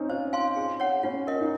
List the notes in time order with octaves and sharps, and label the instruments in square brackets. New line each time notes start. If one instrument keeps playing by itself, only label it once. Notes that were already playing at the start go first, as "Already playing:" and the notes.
Already playing: [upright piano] C4 C#4 D#4
[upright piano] F4 [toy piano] C5
[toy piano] F5 G#5 C6
G#4
C#5 F#5
[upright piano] C#4 [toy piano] F4
[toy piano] A#4 D#5
[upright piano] D#4